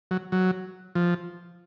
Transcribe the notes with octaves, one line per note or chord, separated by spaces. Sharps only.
F#3
F#3
F3